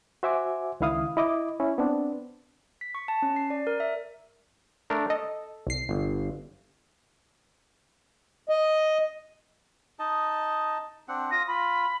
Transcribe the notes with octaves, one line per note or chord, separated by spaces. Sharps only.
F#4 C5 E5 F#5 G#5 D6
C#2 D#3 E4 F5 D#6
E4 D#5 D6
C#4 E4
B3 C4 D4
B6
C#6
A5
C#4
C7
D5
A#4
E5
A3 D4 A#4
A4 D#5
C2 C7
G1
D#5
D#4 D#5 A5
C4 D4 F#5
F4 D#6 A#6
F4 B5